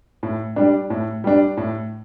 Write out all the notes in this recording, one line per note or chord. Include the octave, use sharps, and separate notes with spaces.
A2
G3 D4
A2
G3 D4
A2